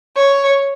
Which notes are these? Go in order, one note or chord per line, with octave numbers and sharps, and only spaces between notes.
C#5